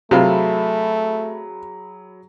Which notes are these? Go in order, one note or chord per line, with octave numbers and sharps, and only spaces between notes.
C3 F#3 A3 F4 G#4 B5